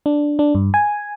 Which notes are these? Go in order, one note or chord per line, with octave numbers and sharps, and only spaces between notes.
D4
D4
G2
G#5